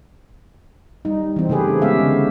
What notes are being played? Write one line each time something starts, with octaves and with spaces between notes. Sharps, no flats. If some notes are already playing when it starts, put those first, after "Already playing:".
G3 D#4
E3 C4
C#3 A3 G4 G#4 B4
G#3 B3 C#4 G4 E5 F5
D3